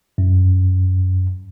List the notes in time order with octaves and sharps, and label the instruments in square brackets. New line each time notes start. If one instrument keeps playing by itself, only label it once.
[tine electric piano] F#2